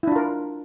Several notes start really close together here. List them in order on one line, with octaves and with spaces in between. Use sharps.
E4 D4 F4 A#4